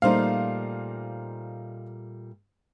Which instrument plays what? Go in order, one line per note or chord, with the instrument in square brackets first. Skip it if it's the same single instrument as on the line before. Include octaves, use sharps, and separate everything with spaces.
[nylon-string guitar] A#2 G3 A3 [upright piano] D#4 C5 F5